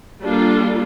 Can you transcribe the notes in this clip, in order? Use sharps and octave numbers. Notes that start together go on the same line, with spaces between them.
G3 A#3 D4 F4 A4